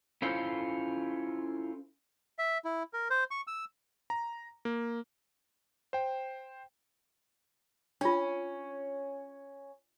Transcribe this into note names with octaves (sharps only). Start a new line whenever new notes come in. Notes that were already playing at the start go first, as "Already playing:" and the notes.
C#4 E4 F4 A4 C5
E5
E4
A#4
C5
C#6
E6
A#5
A#3
C5 G5
C#4 D4 F4